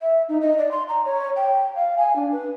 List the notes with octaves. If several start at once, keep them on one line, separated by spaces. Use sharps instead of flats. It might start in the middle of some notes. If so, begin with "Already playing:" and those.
E5
D#4
D#5
D5
C6
A#5
C#5
G5
F5
G#5
D4
B4